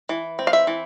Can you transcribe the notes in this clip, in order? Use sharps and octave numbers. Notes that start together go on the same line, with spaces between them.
E3
C4
F5
E5
E3